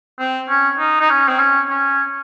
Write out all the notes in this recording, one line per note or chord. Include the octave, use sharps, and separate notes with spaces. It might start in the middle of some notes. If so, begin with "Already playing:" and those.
C4
C#4
D#4
D#4
C#4
C4
C#4
C#4